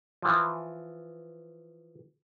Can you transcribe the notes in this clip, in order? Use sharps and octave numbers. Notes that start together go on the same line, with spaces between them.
E3 F3